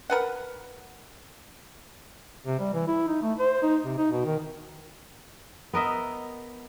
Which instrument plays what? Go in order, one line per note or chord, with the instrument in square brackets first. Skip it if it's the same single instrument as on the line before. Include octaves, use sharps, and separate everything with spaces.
[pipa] A#4 B4 F#5
[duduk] C3
G3
E3
E4
D#4
A3
C5
D#4
C3
D#4
B2
D#3
[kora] B3 A#4 D#5 E5